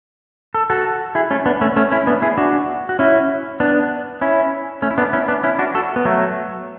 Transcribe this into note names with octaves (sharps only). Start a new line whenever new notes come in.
A4
F#4 A4
E4 G#4
A3 C#4
B3 D4
A3 C#4
A3 C#4
C#4 E4
B3 D4
E4 G#4
D4 F#4
F#4
C#4 E4
B3 D4
C#4 E4
A3 C#4
E4
B3 D4
C#4 E4
B3 D4
C#4 E4
D4 F#4
F#4 A4
B3
F#3 A3